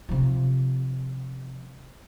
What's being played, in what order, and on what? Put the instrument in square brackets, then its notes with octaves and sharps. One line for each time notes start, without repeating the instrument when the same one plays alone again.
[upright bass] C3 F3